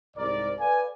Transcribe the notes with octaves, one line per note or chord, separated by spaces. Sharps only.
C2 G#2 A#4 D5
A4 B4 D5 F5 G#5